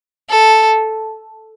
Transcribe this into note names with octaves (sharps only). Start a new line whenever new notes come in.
A4